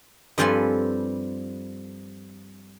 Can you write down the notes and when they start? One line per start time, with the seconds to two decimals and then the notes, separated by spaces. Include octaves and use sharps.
0.38 G2 F3 C4 A4 B4 G#5